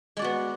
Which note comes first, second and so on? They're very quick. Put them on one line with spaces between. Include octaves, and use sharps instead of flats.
G#3 D5 F#4 B3